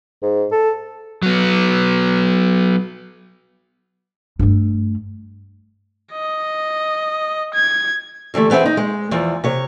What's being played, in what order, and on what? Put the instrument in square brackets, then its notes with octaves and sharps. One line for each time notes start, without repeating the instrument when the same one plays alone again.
[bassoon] G#2
A4
[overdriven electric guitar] F#3 B3
[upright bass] G2 A3
[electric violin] D#5
G#6
[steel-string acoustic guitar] D3 E3 G3 A3
E3 B3 C4 G#4 E5
D#4
G#3
E2 E3 F3
C3 C#5